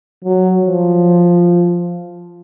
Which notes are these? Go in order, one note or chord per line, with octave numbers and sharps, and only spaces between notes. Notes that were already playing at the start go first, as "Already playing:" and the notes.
F#3
F3